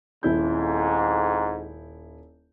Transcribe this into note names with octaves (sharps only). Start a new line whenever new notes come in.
D#1 F2 G#2 E4 G6